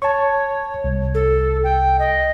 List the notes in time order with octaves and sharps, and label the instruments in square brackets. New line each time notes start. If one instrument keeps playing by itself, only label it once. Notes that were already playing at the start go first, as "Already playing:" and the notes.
[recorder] C#5 [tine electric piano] A5 C#6
[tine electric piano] C2
[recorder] A4
G5
D#5